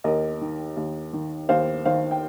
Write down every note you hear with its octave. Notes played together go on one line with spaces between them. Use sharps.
D#2 A#4 D#5
D#3
D#2
D#3
D#2 C5 F5
D#3 C5 F5
G5